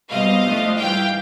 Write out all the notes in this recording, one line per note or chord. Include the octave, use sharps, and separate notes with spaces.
B2 G3 C4 D#5 F5
A2 F3 A3 D4
G#2 E3 G3 F5 G5